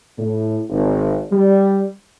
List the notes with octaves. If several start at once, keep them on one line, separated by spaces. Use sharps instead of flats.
A2
G#1
G3